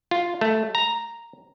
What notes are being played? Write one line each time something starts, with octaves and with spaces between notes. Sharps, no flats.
F4
A3
A#5